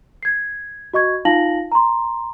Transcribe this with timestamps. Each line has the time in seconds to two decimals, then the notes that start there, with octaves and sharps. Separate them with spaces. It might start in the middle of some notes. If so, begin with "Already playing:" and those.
0.23 G#6 C7
0.94 F#4 D#5 C#6 G#6
1.25 D#4 F4 F5 A5 A#6 F#7
1.72 A#5 C6